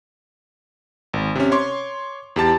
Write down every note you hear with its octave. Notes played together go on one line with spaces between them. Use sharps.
G#1
C3 C#4
C#5 C6 D6
E2 G4 A5 A6